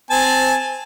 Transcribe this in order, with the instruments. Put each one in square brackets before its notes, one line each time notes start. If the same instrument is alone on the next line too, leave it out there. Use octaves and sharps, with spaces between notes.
[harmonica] C4 G#5 A5